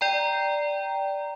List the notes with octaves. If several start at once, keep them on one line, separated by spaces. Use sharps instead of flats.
D5 G5 A#5